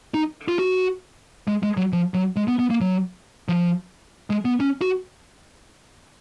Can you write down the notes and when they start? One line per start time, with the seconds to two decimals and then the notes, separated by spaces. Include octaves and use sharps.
0.14 D#4
0.48 F4
0.59 F#4
1.48 G#3
1.63 G#3
1.77 F#3
1.93 F3
2.14 F#3
2.36 G#3
2.48 B3
2.59 B3
2.70 A#3
2.81 F#3
3.49 F3
4.30 G#3
4.45 B3
4.60 C#4
4.81 F#4